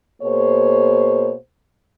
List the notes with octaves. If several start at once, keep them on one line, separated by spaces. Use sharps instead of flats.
B2 A#3 G#4 C5 C#5